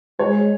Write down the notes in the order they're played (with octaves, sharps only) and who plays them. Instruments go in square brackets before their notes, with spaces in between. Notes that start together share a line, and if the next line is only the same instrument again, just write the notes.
[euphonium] G#3 [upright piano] C#5